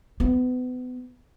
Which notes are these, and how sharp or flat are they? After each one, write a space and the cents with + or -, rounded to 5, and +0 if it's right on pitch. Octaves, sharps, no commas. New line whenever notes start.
B3 +30